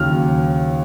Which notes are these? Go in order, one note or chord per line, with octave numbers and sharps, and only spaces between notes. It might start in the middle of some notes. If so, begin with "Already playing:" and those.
Already playing: D#2 C#3 F#3 F6